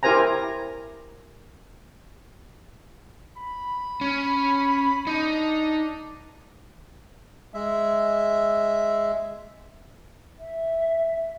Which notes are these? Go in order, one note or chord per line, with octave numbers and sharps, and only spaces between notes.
E4 G4 A#4 C5 G#5 A#5
B5
C#4
D4 D#4
G#3 E5
E5